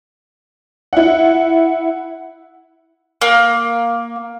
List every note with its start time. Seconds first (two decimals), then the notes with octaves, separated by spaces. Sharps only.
0.93 E4 F#5
3.22 A#3